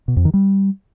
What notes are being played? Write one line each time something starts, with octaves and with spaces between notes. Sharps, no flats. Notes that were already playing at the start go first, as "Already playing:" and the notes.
B2
F2
D#3
G3